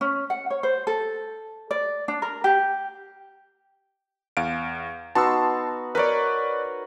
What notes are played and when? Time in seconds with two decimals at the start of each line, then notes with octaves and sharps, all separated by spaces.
0.01 C#4
0.30 F#5
0.50 C#5
0.63 C5
0.87 A4
1.71 D5
2.08 D4
2.22 A#4
2.44 G4
4.37 E2 F5 D7
5.15 B3 D#4 F#4 A5 C6 E6
5.95 A#4 B4 C#5 D5